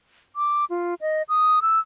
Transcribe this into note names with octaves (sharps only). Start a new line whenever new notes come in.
D6
F4
D#5
D#6
E6